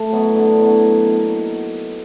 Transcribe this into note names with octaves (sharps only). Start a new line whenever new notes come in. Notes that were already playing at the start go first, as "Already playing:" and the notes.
Already playing: A3
F#3 B3 E4
D3
F#3 B3 E4
F#3
A#3 D#4
F#3